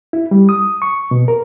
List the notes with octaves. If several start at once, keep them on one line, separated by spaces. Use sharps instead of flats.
E4
G3
D#6
C#6
B2
A#4